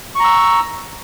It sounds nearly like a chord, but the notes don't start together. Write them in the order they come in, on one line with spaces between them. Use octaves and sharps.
C#6 A#5 E6